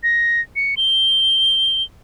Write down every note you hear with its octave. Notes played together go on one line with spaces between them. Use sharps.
A#6
C#7
G7